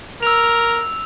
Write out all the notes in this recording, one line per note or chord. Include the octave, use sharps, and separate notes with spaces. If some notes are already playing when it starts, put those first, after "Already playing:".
A#4 E6 F7